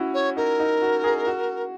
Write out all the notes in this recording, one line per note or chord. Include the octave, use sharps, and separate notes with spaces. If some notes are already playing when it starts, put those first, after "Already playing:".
Already playing: C#4 E4 F#4
C#5
D#4 A#4
D#4
F#4
G#4
F#4